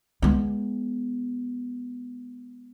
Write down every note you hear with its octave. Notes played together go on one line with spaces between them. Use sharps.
G#3 B3